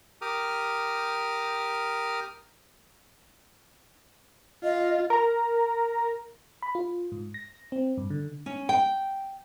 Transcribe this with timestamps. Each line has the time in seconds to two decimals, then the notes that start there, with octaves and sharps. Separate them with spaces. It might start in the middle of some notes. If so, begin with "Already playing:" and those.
0.22 G4 A#4 D6 D#6 F6
4.64 F4 D#5
5.10 A#4 A#5
6.62 B5
6.75 F4
7.12 G#2
7.34 A#6
7.72 C4
7.98 G2
8.10 D3
8.46 C#4
8.69 G5